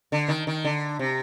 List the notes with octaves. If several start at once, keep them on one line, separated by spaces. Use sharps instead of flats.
D3
D#3
D#3
D3
C3